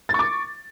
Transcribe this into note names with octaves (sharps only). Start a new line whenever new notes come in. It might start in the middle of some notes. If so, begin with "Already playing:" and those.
C#6 D6 A6